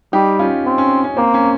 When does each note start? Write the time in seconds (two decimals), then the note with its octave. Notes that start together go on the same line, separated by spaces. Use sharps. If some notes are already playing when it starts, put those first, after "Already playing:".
0.13 G3 D#4 G4
0.39 C#4 F4
0.65 C4
0.78 C#4
1.04 C#4
1.17 A#3 C4
1.34 C#4